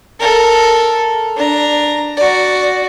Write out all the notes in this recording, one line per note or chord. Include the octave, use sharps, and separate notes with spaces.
A4 A#4
D4 A#5
F#4 D5